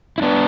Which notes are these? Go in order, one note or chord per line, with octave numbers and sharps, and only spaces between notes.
E4
B3 D4